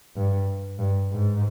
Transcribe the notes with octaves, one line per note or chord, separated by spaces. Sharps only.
G2
G2
G#2